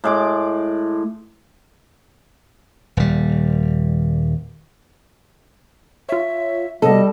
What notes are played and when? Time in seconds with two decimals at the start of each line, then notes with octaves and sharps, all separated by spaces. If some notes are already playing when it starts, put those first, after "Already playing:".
0.04 A2 G#3 D6
2.97 D#1 G3
6.09 F4 C#5 E5
6.82 C3 F#3 G3 B3 A4 D#5